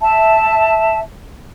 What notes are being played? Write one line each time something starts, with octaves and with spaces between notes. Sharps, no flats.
E5 A5